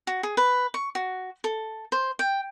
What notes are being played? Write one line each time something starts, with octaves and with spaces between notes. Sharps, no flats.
F#4
G#4
B4
C#6
F#4
A4
C5
G5